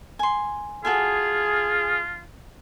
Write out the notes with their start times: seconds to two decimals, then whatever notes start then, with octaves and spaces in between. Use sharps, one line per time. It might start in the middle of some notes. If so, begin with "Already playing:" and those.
0.19 G#5 C6
0.85 F4 F#4 G#4 A4 G#5